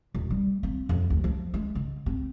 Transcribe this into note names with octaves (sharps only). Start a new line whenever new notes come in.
E1
G3
C4
F2
D2
F3
G#3
C#3
C4